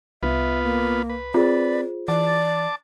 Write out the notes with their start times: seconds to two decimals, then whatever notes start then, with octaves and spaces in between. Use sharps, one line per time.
0.23 C2 B3 F4 B4 E5
0.63 A#3
1.10 B4
1.34 C4 F4 G#4 C5 D5
2.08 E3 D5 A5 D6